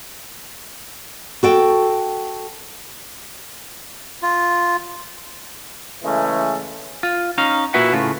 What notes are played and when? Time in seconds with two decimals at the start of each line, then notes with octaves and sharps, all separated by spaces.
1.43 F#4 A4 G5
4.23 F4
6.04 C#3 E3 G#3 A3 C#4
7.03 F4
7.38 C#4 D#4 F5
7.74 A#2 E4 F#4 B4 E5 F#5
7.93 A2 C#3 F4